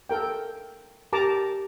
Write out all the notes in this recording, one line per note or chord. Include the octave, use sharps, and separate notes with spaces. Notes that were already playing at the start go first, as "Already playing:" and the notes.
A4 A#4 G5
G4 A#4 A5 A#5 D6